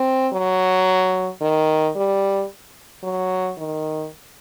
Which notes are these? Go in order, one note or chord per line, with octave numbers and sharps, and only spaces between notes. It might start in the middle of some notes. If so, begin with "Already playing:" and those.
Already playing: C4
F#3
D#3
G3
F#3
D#3